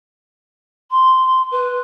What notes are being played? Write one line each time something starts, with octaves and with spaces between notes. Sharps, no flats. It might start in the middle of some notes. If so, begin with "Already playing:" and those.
C6
B4